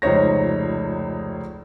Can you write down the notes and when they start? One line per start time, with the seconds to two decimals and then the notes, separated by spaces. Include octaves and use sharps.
0.02 F1 C#2 D#4 C5 C#5 A#6